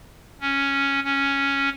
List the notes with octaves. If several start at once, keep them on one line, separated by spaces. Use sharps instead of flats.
C#4
C#4